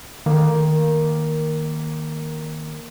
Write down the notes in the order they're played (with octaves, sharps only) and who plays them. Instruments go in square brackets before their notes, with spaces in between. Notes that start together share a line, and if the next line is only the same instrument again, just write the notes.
[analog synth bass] D#3 [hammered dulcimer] A#3